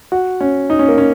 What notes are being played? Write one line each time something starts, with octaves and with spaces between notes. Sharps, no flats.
F#4
C#4
D#4
C#4
A#3
C#4